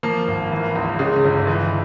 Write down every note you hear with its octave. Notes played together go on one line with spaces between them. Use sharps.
F3 A#3
G#1
E3
C#2
C#3 G#3
G1
E3